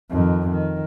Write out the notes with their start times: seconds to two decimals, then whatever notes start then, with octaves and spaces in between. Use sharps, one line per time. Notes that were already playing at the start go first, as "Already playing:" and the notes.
0.11 F2 D#3
0.51 D#3